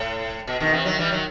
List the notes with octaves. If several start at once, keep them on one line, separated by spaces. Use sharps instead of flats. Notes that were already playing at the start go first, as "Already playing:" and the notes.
Already playing: A2
B2
B2 D#3
C3 E3
D#3 F#3
E3 G3
D#3 F#3